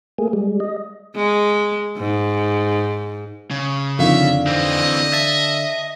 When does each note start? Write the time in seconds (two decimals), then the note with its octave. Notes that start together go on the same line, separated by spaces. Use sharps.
0.18 A3 A#3 G#4
0.33 G3 G#3
0.60 D#5
1.16 G#3
1.98 G#2
3.51 C#3
3.99 F2 D3 D#3 E5 F5
4.47 E3 C4 D#5
5.13 E5 A5